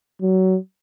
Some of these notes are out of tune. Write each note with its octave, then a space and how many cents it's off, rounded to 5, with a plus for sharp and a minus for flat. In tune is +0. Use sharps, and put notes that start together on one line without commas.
F#3 +20